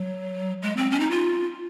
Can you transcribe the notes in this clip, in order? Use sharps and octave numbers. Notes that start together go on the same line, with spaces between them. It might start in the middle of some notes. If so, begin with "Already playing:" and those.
Already playing: F#3
G#3
C4
C#4
D#4
F4